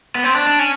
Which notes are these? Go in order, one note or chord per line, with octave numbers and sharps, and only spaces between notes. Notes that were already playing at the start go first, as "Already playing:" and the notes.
B3
C4
D4
D4
C#4